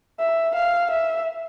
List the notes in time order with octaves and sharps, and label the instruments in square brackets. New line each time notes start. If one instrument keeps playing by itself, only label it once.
[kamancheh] E5
F5
E5